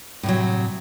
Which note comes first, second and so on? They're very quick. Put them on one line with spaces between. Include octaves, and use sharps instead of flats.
A2 C3 F#3